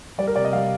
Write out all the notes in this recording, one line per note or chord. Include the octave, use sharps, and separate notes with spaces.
G3 D5
A#4
C3 D5
D#5
G3 F5